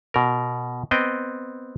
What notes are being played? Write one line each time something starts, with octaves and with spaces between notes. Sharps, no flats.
B2 A#4
B3 C4 D#5 G5